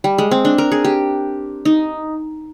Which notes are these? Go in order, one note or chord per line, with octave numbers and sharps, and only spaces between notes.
G3
G#3
C4
D4
A#4
G#4
G4
D#4